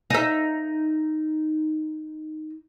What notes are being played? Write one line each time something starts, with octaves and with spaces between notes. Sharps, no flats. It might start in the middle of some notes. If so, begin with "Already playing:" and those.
D#4 E5